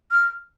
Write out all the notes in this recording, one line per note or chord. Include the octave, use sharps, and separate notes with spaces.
F6